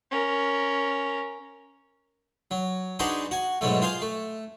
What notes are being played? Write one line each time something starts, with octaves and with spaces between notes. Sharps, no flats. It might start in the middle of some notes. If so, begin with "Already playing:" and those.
C#4 A#4
F#3
D4 D#4 F#4 G#4 B4 C5
F#4 G#5
G#2 B2 F#3 A3
F4 G#4 C5 F5
A3